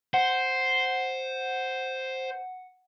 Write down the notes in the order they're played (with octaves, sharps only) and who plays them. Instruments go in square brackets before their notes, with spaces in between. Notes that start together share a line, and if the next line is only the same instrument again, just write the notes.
[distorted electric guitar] C5 [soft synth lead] F#5